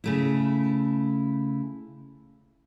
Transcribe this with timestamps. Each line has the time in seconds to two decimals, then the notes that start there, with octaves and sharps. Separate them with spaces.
0.04 C#3 A3 E4